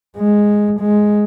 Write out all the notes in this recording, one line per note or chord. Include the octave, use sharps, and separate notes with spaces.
G#3
G#3